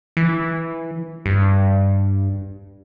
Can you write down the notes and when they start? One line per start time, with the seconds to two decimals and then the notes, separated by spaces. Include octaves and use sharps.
0.17 E3
1.26 G2